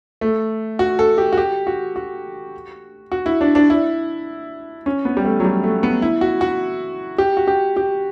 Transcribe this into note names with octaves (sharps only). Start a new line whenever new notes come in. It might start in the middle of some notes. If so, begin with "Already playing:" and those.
A3
F#4
A4
G4
F#4
G4
F#4
F#4
F#4
E4
D4
D4
E4
C#4
B3
G3
A3
F#3
G3
A3
B3
E4
F#4
F#4
G4
F#4
G4
G4